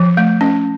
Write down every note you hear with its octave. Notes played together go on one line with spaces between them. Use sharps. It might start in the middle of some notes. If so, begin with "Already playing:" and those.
Already playing: F3
A3
C#4